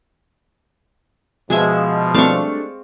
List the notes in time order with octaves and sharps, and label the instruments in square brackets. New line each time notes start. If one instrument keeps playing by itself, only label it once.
[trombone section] B2 F3 [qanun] G#3 G#4 E5
[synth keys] G3 A3 D4 [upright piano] C4 [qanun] F5 C#6